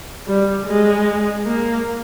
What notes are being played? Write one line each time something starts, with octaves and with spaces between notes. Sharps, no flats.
G3
G#3
A#3